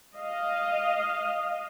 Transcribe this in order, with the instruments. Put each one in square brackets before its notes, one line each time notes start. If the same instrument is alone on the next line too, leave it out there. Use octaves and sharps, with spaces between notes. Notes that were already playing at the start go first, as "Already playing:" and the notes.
[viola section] D#5 F5